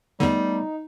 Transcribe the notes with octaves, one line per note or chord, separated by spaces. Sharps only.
E2 D3 G3 A3 B3 D#4